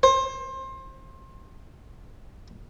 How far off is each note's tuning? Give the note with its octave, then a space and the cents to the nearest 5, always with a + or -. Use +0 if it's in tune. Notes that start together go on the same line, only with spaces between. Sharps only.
C5 +25